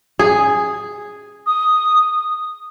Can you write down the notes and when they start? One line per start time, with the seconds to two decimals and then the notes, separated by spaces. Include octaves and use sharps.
0.19 G#4
1.46 D#6